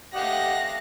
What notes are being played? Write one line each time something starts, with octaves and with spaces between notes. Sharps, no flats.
A3 G4 D#5 F5 F#5 F#6 A#6